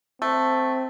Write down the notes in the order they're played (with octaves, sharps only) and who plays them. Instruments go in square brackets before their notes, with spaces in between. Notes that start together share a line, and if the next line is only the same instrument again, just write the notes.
[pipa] A3 [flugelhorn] C4